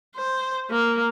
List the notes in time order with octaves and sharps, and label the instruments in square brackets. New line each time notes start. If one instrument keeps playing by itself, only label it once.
[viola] C5
A#3